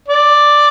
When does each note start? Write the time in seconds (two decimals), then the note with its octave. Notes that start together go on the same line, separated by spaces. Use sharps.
0.08 D5